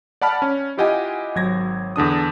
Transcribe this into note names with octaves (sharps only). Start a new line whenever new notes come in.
D5 F#5 A5 B5 F6
C#4
E4 F4 G4 D#5 F#5 G#5
G#1 F#3 G#6 A#6
E2 D3 D4 D#6